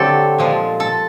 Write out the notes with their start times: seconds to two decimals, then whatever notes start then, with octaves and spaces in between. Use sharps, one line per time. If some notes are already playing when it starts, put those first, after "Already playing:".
Already playing: D3 F#3 A3 C4 G4 A4
0.38 A#2 F3 G#3
0.80 A4